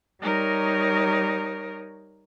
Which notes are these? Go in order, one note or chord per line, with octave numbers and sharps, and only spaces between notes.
G3 D#4 A#4 C#5